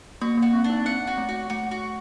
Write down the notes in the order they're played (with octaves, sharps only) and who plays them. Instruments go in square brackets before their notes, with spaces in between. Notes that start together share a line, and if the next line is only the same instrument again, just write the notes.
[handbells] A#3 [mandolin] F#4
[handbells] A#3 [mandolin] F#4
[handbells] C4
[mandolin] D4
[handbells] D#4
[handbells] C4 [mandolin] F#5
[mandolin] F#4
[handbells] A3
[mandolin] F#4
[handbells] A3 [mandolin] F#4
[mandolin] F#4